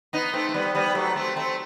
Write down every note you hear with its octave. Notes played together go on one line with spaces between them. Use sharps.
B3 D#4
A3 C4
A3
G3 B3
G3 B3
F#3 A3
A3 C4
A3 C4